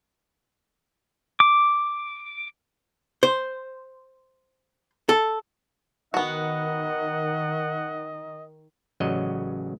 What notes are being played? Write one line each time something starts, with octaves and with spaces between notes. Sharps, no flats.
D6
C5
A4
D#3 B3 F#4 D#5 F#5
A1 C#3 F#3 F#4 D5 D#5